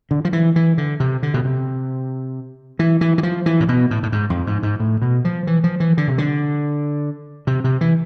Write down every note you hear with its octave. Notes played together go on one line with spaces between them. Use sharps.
D3
F3
E3
E3
D3
C3
D3
B2
C3
E3
E3
E3
F3
E3
A2
B2
A2
A2
G#2
F2
G#2
G#2
A2
B2
F3
E3
F3
E3
D3
C3
D3
C3
C3
E3